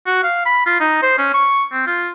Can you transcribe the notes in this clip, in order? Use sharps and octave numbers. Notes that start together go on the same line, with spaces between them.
F#4
F5
B5
F4
D#4
C5
C#4
C#6
C4
F4